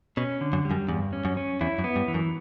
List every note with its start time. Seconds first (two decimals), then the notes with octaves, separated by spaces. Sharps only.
0.17 B2 C#4
0.41 D3
0.53 F#2
0.65 G3
0.71 F#2
0.88 E2 G2
1.13 C#4
1.25 F#2
1.37 C#4
1.61 E2 E4
1.78 F#2
1.84 B3
1.96 G2
2.08 E3
2.14 F#2